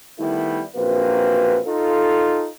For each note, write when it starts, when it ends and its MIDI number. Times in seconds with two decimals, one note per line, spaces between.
0.19 0.63 51
0.19 0.63 55
0.19 0.63 57
0.19 0.63 59
0.19 0.63 64
0.75 1.58 34
0.75 1.58 42
0.75 1.58 58
0.75 1.58 60
0.75 1.58 66
0.75 1.58 71
1.66 2.49 63
1.66 2.49 65
1.66 2.49 69